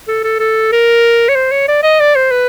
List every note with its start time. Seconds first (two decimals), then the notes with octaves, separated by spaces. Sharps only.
0.08 A4
0.24 A4
0.40 A4
0.72 A#4
1.29 C#5
1.35 C5
1.52 C#5
1.68 D5
1.83 D#5
2.00 D5
2.16 C5
2.31 B4